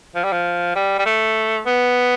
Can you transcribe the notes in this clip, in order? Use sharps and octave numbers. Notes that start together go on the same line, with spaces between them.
F3
G3
F3
G3
G3
A3
B3